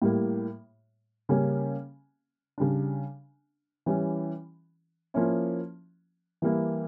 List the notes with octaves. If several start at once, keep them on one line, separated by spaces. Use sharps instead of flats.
A2 G3 A#3
C#3 G3 A#3 C#4
C#3 G3 D4
E3 G3 C#4 E4
F3 A#3 C#4 E4
E3 G3 A#3 E4